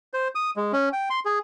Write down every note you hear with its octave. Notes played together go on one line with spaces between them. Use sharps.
C5
D#6
G#3
C#4
G5
C6
G#4